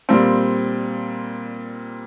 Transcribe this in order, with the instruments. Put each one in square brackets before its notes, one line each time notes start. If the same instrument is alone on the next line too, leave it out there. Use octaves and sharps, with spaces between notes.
[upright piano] A#2 G3 C4